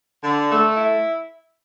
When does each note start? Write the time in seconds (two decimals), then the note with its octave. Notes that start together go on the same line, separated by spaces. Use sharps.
0.24 D3
0.51 A3
0.75 E4